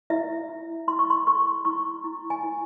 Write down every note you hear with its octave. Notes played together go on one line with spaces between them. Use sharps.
E4 E5
E4
E4 C6
C#6
C6
G#4 C#6
E4 C#6
E4
G#5
E4